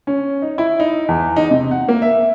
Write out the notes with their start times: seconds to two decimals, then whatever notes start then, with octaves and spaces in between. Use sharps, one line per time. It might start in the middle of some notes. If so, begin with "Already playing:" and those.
0.07 C#4
0.42 D#4
0.58 E4
0.80 D#4
1.09 E2
1.36 D#4
1.51 C3
1.71 F#5
1.88 A#3
2.02 E5